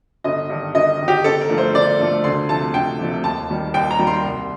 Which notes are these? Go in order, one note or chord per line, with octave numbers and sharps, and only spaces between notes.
G1 D#5
G2 D#3
G1 D#5
G2 D#3
G4
G1 A4
A#4
G2 F3 A3
C5
G1 D5
G2 F3 A3
D2 C6
C3 F3 A3 A5
D2 G5
C3 F3 A3
D#2 A5
D#3 G3
D#2 G5
A#5
D#3 G3
C6
C2